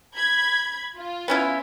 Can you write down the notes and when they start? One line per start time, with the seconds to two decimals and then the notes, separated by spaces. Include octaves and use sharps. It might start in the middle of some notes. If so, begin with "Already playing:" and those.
0.15 B5 G#6
0.96 F4
1.28 B3 C#4 E4